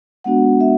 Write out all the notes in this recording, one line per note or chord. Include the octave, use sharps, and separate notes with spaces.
G#3 B3 D4 F#4 F#5
E5